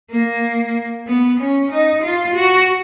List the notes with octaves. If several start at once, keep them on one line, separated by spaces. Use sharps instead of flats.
A#3
B3
C#4
D#4
F4
F#4